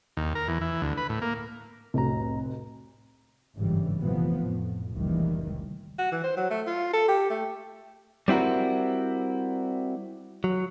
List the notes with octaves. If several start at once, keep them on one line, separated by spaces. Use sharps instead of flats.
D#2
A#4
E2
E3
D2
B4
A2
A#3
F1 C2 A2 F#4 A#5
G1 G#2 C#3 E3 G3
F1 A#2 E3 F3 B3
F2 A2
F1 C#2 A#2 D#3 E3 G3
F#4
E3
C5
F#3
A3
F4
A4
G4
A3
G3 C4 E4 F#4 A#4
F#3